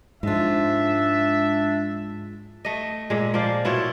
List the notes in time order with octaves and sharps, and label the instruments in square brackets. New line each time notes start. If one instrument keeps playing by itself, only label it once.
[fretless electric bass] G#2 F3 [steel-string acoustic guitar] G#3 F4 [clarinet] D4 [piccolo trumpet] E5
[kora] A3 D#5
A#2 G#3
F3 A#3 D5 F5
B2 E4 F4 C#5